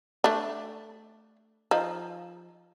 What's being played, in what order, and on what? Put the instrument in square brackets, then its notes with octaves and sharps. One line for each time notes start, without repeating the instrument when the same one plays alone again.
[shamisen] A3 D4
F3 D#4